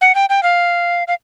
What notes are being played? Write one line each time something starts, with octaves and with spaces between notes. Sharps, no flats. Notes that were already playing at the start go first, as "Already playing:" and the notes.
F#5
G5
G5
F5
F5